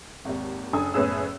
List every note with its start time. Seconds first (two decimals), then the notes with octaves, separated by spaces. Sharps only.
0.25 G#1 D#2
0.73 F#1 D4 A4 G#5 D#6
0.94 F#1 A2 B3 C#4 G#4 E6